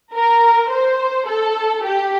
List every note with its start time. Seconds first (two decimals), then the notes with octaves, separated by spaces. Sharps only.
0.14 A#4
0.70 C5
1.27 A4
1.85 G4